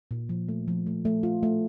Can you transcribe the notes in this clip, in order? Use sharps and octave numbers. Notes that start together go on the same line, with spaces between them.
A#2
F3
A3
F3
A3
A3
F4
A3